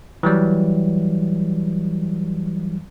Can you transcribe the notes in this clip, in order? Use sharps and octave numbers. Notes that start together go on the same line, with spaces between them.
E3 F#3 G3